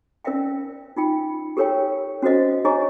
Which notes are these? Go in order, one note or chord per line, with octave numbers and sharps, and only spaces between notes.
C#4 A#4 D5 E5 F5 G5
D#4 F4 G5
G4 A4 A#4 C#5 F5 G5
C#4 F#4 A4 C5 D#5 F5
D4 G#4 C#5 D#5 A#5 C#6